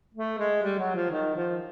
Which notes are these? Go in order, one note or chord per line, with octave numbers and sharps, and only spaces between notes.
A3
G#3
G3
F#3
F3
D#3
F3